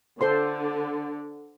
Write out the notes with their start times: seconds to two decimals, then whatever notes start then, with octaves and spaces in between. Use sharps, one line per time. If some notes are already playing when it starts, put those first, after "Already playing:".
0.21 D3 A4 C5 C6